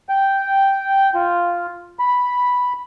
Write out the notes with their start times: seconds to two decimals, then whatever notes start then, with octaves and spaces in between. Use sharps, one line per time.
0.09 G5
1.15 F4
1.99 B5